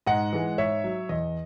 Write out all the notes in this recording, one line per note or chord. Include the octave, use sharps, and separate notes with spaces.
G#2 D#5 F#5
E3 G#3
G#2 C#5 E5
F#3
E2 D#5